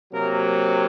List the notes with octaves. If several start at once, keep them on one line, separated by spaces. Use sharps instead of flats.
C3 F#3 A#3 A#4